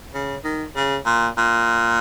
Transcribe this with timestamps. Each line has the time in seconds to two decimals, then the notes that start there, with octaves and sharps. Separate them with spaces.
0.14 C#3
0.44 D#3
0.76 C#3
1.06 A#2
1.38 A#2